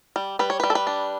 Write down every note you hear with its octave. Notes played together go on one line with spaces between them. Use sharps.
G3
G3 B4
C#5
G3 B4
A4
B4
D4